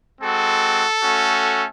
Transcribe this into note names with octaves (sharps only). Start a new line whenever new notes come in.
G#3 C4 F#4 A4
A3 C#4 F#4